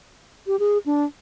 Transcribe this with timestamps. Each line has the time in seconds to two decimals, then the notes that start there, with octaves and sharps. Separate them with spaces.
0.47 G4
0.59 G#4
0.86 D4